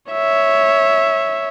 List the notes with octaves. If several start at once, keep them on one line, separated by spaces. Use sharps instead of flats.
C#5 E5